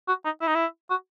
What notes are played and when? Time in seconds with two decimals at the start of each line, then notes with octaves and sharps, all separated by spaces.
0.08 F#4
0.25 D#4
0.41 E4
0.48 D#4
0.55 E4
0.90 F#4